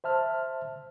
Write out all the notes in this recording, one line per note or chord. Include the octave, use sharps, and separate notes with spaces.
C5 E5 A5 F6